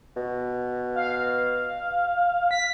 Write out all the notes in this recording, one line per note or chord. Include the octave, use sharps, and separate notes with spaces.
B2
F5
B6